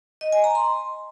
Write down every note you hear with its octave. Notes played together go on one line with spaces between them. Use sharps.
D#5
G#5
A#5
C6